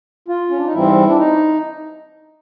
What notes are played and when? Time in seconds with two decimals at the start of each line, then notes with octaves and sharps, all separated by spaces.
0.28 F4
0.50 C#4
0.58 D4
0.65 D#4
0.73 G#2 E3 G3 C4 E4
1.08 D4
1.18 D#4